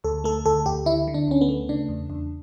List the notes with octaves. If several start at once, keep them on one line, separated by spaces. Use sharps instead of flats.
D2 A4
A3 A4
D2 A4
D2 G4
D3 E4
D3
D4
D2 C#4
B3
A3
C#3 D4
E2
E2